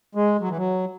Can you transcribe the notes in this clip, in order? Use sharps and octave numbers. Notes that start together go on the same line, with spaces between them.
G#3
F#3
E3
F#3